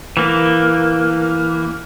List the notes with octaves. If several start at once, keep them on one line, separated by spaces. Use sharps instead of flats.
E3 A#3